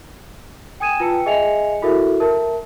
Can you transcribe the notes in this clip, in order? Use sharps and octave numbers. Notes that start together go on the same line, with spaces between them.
G5 G#5 D#6 G#6 D#7 E7
F4 B4 G5 A5 E6 C#7
G#4 D#5 E5 G#5 C#7 F7
E4 F#4 A4 A#4 E5
A#4 E5 A5